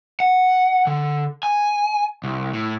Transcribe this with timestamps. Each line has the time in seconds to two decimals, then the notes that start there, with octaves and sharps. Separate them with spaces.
0.20 F#5
0.87 D3
1.43 G#5
2.24 C2
2.53 A2